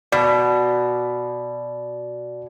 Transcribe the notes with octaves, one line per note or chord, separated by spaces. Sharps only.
B2 D5